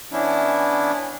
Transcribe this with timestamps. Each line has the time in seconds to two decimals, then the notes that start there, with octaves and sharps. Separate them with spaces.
0.12 E3 B3 C#4 D4 E4